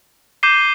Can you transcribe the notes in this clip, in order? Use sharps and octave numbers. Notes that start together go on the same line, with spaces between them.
D6 G6 C7 D#7 G7